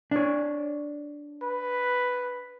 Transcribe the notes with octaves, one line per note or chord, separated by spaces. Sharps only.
D4 C#5
B4